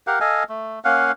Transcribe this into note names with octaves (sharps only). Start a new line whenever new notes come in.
G4 A#4 F5 F#5
A4 D#5 F5 G#5
A3
A#3 C#4 F5 F#5